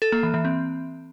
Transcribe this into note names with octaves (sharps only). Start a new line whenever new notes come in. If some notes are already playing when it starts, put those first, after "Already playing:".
A4
A#3
E3
E3
C4